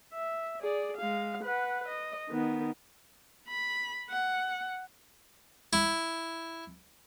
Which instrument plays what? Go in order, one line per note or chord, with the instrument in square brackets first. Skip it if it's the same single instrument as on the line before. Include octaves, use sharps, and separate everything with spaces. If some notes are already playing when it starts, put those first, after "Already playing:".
[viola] E5
G#4 D5
G#3 F5
B4 F#5
D#5
D#3 B3
B5
F#5
[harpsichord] E4